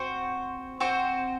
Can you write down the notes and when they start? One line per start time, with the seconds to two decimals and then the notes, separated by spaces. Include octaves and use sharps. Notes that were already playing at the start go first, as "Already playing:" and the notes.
Already playing: C4 F#4 C5
0.80 C4 F#4 C5